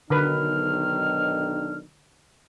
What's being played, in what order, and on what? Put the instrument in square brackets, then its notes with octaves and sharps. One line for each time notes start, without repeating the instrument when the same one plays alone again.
[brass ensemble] B1 D#3 D4 [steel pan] D3 A#4 B4 [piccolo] F6